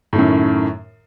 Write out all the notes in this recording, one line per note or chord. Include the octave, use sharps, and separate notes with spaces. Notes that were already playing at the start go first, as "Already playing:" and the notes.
F#2 A2 D#3